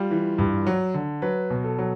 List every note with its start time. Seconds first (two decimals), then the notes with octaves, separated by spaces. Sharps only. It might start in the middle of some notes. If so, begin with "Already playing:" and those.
Already playing: G3 F4
0.11 E3
0.38 G2
0.67 F#3
0.94 D3
1.22 F#3 B4
1.50 B2
1.64 A4
1.79 F#3